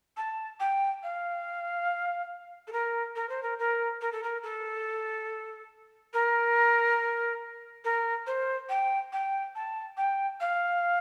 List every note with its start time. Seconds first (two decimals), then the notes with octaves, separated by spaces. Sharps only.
0.17 A5
0.60 G5
1.03 F5
2.68 A4
2.72 A#4
3.16 A#4
3.29 C5
3.43 A#4
3.59 A#4
4.01 A#4
4.12 A4
4.23 A#4
4.43 A4
6.14 A#4
7.84 A#4
8.27 C5
8.69 G5
9.13 G5
9.55 A5
9.97 G5
10.41 F5